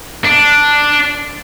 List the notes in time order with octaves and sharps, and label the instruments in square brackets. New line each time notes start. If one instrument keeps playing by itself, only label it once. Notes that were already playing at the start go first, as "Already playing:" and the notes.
[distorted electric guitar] D4